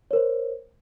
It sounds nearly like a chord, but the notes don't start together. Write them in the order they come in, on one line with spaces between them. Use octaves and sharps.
C#5 A#4 C5